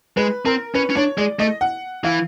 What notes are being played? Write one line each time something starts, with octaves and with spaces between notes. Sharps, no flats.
G#3 B4
C4 A#4
C#4 B4
C#4
D4 C#5
G#3 D5
A3 D#5
F#5
E3 F5